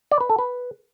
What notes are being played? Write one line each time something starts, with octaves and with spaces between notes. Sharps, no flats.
D5
B4
A4
B4